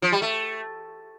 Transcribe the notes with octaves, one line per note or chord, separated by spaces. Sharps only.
F3
G3
A3